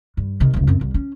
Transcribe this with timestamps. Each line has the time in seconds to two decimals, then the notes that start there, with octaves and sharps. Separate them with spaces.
0.17 G2
0.40 C3 D#3
0.54 E1 C#2
0.67 F#2 C4
0.81 C2
0.94 C#4